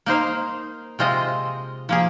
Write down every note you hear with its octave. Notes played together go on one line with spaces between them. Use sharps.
A#3 D#4 C5 F5
C3 G#3 F4 C5 D#5
F3 A#3 G#4